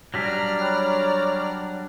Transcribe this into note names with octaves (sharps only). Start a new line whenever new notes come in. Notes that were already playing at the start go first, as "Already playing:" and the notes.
F#3 G3 D4 D5 A#5 F6 A#6 B6
C#5 G5 B5 F#6